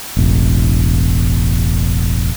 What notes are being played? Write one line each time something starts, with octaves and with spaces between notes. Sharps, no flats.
E1 A1